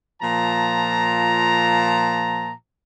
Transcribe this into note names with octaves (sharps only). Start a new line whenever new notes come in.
A#2 F3 A5 A#5